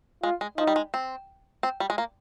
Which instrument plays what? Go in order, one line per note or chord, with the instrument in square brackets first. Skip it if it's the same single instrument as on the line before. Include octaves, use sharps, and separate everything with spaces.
[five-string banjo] G#3 [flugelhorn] F4
[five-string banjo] G#3
[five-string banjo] F3 [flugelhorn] D#4
[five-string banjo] G3
G#3
C4
C4
G3
G#3
A#3